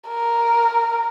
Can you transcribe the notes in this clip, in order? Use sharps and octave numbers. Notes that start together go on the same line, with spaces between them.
A#4